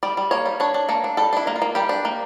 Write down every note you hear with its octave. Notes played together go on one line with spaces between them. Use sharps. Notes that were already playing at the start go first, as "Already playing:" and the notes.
G3 D5
G3
A#3 C#5
G3
D4 C#5
D4
A#3 A4
D4
G3 A4
D4 E4
A#3
F4
A#3
G3 G4
D4
A#3